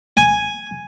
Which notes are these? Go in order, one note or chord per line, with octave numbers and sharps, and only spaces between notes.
G#5